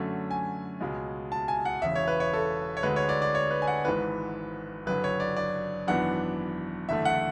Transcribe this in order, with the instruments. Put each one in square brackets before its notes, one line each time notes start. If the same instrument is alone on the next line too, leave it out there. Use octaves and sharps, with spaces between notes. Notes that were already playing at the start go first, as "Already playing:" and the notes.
Already playing: [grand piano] F#2 D3 F#3 A3 C#4
G#5
C#2 B2 G#3
A5
G#5
F#5
E1 E2 C#3 E5
C#5
B4
C#5
A4
C#5
D2 D3 G#3 B4
C#5
D5
D5
C#5
B4
G#5
F#5
G#1 G#2 E3 B4
F#1 F#2 D3 B4
C#5
D5
D5
G#1 F#2 E3 B3 D4 F#5
F#1 E2 D3 A3 E5
F#5